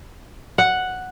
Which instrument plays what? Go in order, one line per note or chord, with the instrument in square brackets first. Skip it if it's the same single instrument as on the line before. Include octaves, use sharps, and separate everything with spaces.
[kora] F#5